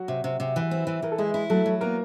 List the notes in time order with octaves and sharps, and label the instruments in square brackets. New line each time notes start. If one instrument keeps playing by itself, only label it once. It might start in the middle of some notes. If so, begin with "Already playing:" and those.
Already playing: [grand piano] F#3 F#4
[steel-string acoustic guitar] C3
C3
C3
E3
C4
E3
[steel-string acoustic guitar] E3 [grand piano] A#4
[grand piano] A4
[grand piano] G#3 G#4 [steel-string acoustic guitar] E4
[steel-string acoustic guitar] E4
[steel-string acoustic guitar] F#3 [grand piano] A3 A4
[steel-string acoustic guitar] F#3
[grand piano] A#3 A#4 [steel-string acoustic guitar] B3